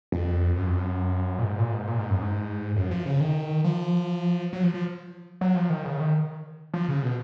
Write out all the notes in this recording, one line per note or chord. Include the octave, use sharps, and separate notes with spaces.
F2
F#2
F2
F#2
A#2
G#2
A#2
G#2
A#2
G#2
F#2
G#2
F#2
F3
C#3
D#3
F3
F#3
F3
F3
F#3
F3
D#3
C#3
D#3
F3
C#3
B2